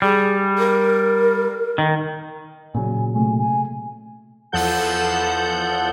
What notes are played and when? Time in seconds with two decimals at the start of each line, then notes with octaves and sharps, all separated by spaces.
0.02 G3 G#4
0.58 A#4
1.78 D#3
2.75 A#2 C#3 F#3 G#5
3.14 C3 A3 G#5
3.38 G#5
4.52 E2 F3 A4 F#5 G6